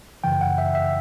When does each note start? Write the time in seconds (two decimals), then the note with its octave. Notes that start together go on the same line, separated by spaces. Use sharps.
0.24 F#2 C#3 E3 G5
0.41 F#5
0.58 E5
0.75 E5